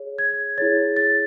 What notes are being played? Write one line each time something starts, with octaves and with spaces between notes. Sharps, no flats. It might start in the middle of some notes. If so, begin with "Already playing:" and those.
Already playing: G#4 C#5
G#6
E4 G#4 C#5 A6
A6